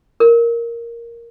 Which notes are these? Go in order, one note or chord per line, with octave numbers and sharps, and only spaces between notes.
A#4